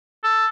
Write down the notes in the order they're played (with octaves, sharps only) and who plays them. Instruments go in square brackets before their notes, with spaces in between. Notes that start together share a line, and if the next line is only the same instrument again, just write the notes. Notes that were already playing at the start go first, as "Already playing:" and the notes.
[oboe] A4